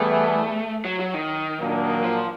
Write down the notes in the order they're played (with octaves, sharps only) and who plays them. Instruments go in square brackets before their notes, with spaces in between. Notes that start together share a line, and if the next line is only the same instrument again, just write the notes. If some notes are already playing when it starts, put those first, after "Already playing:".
Already playing: [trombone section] E3 G3 B3 E4 G#4 [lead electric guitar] A3
[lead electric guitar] F#3
F#3
D#3
[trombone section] A#2 F#3 A#3 D4
[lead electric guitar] F3